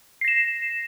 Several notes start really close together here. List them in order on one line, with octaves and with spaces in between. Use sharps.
C7 A#6 E7